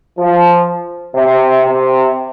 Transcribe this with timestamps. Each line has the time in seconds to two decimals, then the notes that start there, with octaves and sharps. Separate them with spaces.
0.18 F3
1.15 C3
1.64 C3